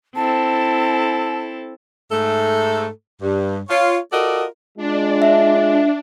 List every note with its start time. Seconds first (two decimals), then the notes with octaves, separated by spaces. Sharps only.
0.16 C4 E4 A4 A5
2.11 G#2 A3 A4
3.21 G2
3.69 F4 C#5
4.13 F4 F#4 A4 A#4 D5 D#5
4.77 G#3 D4 F4
5.22 E5